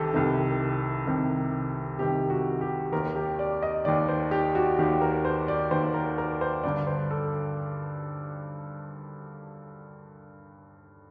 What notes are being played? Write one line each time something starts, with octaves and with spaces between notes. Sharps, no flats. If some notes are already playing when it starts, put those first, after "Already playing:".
Already playing: C2 C3 D#3 G4 A4
C2 C3 D#3
C2 C3 D#3
C2 C3 D#3 G4
F#4
G4
D#2 D#3 A#4
G4
D5
D#5
D#2 D#3 D5
C5
G4
F#4
D#2 D#3 G4
A#4
C5
D5
D#2 D#3 C5
A#4
A#4
C5
G2 D3 D5
C5
A4